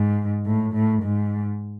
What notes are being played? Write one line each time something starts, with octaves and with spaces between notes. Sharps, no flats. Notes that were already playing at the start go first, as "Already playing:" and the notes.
Already playing: G#2
A2
A2
G#2